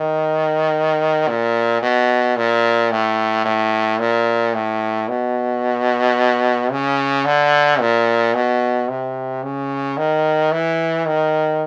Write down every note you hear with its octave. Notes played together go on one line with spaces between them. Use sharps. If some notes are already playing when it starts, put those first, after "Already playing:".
Already playing: D#3
A#2
B2
A#2
A2
A2
A#2
A2
B2
C#3
D3
A#2
B2
C3
C#3
D#3
E3
D#3